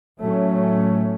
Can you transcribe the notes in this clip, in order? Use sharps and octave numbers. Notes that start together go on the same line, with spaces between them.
A2 F#3 A3 C#4